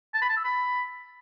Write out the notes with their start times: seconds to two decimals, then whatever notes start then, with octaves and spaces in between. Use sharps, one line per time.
0.14 A5
0.22 B5
0.29 A5
0.37 E6
0.44 B5